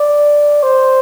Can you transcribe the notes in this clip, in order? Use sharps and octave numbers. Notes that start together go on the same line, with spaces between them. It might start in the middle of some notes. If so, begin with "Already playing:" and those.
Already playing: D5
C5